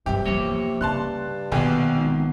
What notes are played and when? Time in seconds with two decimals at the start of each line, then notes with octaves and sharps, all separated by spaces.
0.06 G2 C3 F#3 G4
0.25 E2 F3 A#3 C#5
0.81 G2 C#3 A5 C6 F#6
1.52 A#1 B2 D3 D#3 F3 B3 G#4 G5
1.95 G#1